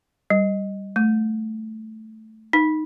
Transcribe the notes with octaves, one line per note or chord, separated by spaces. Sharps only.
G3
A3
D#4